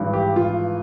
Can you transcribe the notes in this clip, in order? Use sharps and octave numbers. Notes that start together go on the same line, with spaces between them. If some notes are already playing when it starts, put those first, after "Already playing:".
Already playing: G#1 G2 E3
G4
F4